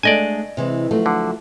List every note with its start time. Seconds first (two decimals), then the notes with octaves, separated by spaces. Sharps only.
0.03 G#3 A3 D4 D5 D#5 G#5
0.57 C3 E3 G#3
0.91 F3 F#3 A3
1.06 D3